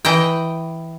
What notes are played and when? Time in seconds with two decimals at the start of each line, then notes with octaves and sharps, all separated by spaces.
0.05 E3 D#5 G5